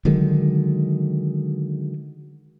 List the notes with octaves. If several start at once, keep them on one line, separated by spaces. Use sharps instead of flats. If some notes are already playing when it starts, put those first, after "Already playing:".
D3 D#3 F#3 G#3